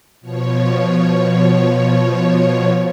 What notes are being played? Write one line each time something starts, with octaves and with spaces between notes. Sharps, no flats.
B2 F3 C#5